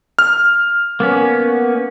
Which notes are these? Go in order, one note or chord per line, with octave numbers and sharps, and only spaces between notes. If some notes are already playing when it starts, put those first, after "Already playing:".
F6
A#3 B3 C#4